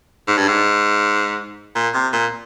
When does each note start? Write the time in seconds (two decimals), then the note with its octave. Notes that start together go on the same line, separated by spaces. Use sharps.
0.28 G#2
0.38 G2
0.48 G#2
1.75 A#2
1.94 C3
2.13 A#2